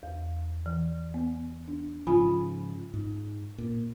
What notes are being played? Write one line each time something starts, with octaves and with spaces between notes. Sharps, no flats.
E2
E3
B3
D4
G#2 C#3 F3 F4 G#5 B5
G#2
A#2